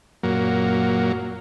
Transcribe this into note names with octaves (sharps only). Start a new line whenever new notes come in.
F#2 A#2 F#3 A#3